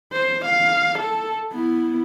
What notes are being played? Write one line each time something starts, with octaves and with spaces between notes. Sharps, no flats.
C5
F5
A4
B3 E4